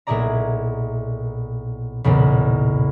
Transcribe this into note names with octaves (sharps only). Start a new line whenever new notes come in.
B1 A#2 E4 G#4 D5 A#5
B1 E2 A#2 C#3